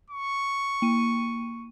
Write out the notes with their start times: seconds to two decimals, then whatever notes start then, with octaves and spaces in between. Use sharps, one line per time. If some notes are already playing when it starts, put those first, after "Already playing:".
0.11 C#6
0.82 A#3 D#7